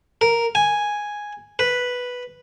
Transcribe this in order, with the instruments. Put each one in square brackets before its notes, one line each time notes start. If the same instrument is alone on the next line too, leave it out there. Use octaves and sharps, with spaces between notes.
[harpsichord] A#4
G#5
B4